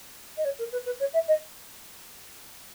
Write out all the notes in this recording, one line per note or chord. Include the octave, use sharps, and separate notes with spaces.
D#5
C#5
A#4
B4
B4
C#5
E5
D#5